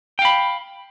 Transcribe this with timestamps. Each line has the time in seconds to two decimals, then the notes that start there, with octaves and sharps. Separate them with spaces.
0.19 G5
0.22 F5
0.25 B5